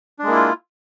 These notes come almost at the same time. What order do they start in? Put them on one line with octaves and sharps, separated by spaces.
D4 G#3 A#3 E4 F4